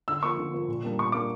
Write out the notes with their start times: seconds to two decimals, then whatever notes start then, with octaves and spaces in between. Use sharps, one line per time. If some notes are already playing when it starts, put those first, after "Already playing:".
0.08 D3 E6
0.23 F3 A#3 C#6
0.38 D3
0.53 F3 A#3
0.68 A#2
0.84 G3 A#3 D4
0.99 A#2 C#6
1.12 G3 A#3 D4 D6